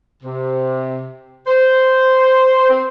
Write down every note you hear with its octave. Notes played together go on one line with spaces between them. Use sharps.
C3
C5
C4